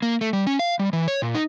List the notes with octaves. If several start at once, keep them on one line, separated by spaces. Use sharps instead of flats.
A#3
A3
G3
C#4
F5
G3
E3
C#5
A#2
D#4